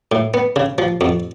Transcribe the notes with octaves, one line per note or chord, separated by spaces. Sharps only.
A2
B3
C#3
F3
F2